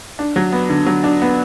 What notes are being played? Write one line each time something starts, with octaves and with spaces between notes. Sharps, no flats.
D4
F#3
B3
D3
F#3
D4
B3